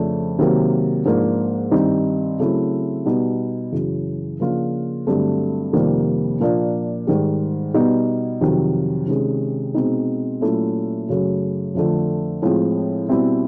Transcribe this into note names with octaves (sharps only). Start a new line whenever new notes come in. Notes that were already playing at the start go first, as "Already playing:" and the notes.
Already playing: F2 C#3 F3 A3 D4
C3 D#3 F#3 A#3
G#2 F3 A#3 D4
G2 D#3 G3 C4 D#4
C#3 F#3 A3 C4 E4
B2 G3 B3 D#4
F#2 C#3 E3
C#3 F3 A#3 D4 F4
G2 D3 F#3 A3 C4
F2 C3 D#3 G3 A#3
A#2 F3 A#3 D4
G#2 D#3 G3
B2 G3 B3 D#4
F2 C3 D#3 F#3
C3 D#3 G#3 C#4
B2 G#3 C4 D#4
A#2 F#3 A3 C#4 E4
F#2 C#3 F#3 A3
F2 D3 F3 A3
A2 F3 G#3 C4
B2 G3 C4 E4